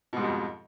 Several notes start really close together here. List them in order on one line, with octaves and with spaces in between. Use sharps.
B2 G#2 G3 F2